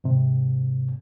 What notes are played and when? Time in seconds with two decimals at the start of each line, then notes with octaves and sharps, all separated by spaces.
0.04 G#2 C3